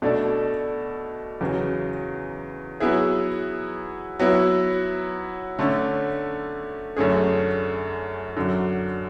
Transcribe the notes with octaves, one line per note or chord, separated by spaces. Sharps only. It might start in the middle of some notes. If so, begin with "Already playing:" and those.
B2 A3 D4 A4 D5
E2 C#3 F#3
F#3 B3 E4 G#4
F#3 B3 E4
D3 A3 C#4
F#2 D3 A3 C#4 G#4
F#2 D3 F#3